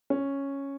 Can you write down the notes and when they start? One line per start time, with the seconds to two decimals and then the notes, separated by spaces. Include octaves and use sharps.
0.10 C#4